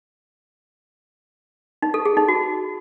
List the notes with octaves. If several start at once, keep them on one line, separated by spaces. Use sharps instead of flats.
D#4
A4
G#4
D#4
F#4